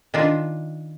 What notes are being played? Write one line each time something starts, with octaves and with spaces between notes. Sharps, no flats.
D#3 D4 F4